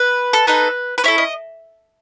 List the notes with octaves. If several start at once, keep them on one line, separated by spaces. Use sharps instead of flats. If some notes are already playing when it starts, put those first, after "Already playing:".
Already playing: B4
A4
B3 D#4 A4 B4
B4
C#4 E4 A4 C#5
D#5